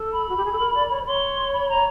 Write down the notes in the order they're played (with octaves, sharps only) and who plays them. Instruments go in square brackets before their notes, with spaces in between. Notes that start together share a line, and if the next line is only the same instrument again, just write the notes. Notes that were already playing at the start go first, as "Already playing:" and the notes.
Already playing: [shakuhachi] A4
[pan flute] B5
[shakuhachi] F#4
G4
G#4
A4
A#4
D5
C#5
C5
[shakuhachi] C#5 [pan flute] C6
[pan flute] B5
A#5